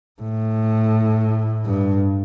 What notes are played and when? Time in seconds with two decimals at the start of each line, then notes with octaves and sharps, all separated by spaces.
0.21 A2
1.65 G2